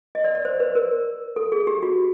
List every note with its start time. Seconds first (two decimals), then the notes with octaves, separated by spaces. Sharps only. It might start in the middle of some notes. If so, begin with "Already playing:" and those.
0.15 D#5
0.24 D5
0.35 D5
0.45 C5
0.60 B4
0.75 A#4
1.36 A4
1.52 G#4
1.67 G4
1.83 F#4